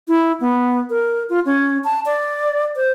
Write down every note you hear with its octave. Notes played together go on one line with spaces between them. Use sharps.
E4
B3
A#4
F4
C#4
A5
D5
C5